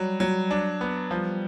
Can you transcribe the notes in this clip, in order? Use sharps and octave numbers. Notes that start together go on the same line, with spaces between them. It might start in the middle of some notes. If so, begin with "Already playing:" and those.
Already playing: F#3 G3
F#3
D4
B3
F3 G3